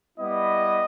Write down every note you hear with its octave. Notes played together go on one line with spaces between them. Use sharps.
G3 B3 E4 D#5